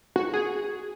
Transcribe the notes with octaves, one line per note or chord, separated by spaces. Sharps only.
F#4
G#4